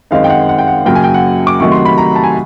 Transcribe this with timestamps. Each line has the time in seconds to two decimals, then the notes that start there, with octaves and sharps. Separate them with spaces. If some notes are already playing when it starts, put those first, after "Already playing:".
0.11 F#2 D#3 G#3 C4 D#4 F5
0.24 G5
0.30 F#5
0.49 F#5
0.58 G5
0.67 F#5
0.86 F#2 C#3 F#3 A#3 G5
0.95 G#5
1.04 G5
1.14 F#5
1.47 D6
1.60 C3 D#3 F#3 A3 C#6
1.72 C6
1.85 B5
1.98 A#5
2.15 A5
2.24 G#5